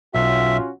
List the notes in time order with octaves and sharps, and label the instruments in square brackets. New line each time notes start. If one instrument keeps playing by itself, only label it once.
[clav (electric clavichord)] B1 [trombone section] C#4 F4 F#4 [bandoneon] E5